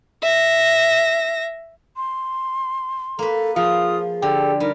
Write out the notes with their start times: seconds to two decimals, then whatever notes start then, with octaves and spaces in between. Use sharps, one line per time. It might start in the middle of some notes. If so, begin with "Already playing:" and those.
0.22 E5 A#6
1.96 C6
3.19 A#3 A4 B4
3.56 F3 F4 G#4 D#6
4.22 D3 G4 A4
4.60 G3 D#4 A#4